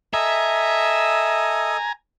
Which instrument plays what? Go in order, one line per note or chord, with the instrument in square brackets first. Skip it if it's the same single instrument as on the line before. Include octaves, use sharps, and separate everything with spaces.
[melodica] A4 D#5 [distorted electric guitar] E5 [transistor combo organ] G#5 A#5